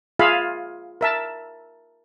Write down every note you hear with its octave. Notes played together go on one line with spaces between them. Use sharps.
F4 G#4 E5 F5 G#5 B5
A#4 E5 A5